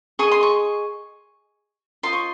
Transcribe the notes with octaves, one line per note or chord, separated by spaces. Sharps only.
G#4 D#5 C#6
C6
C#6
F4 C5 D#5 C6
C#6